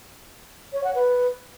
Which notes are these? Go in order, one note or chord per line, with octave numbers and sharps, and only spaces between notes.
C#5
F#5
B4